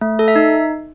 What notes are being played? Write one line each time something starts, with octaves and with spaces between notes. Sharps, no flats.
A3
A4
E5
D#4